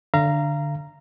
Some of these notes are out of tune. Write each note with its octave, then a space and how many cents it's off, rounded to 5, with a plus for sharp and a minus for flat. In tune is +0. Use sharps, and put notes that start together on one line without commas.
D3 +5 F5 -30 A#5 +0